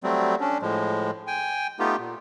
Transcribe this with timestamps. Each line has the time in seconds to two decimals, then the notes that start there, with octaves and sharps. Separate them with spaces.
0.04 F#3 G3 A3 C4
0.41 C#4 D4
0.62 A2 F3 G#3
1.27 G5 G#5
1.79 A3 B3 D#4 F4 G4
1.99 A#2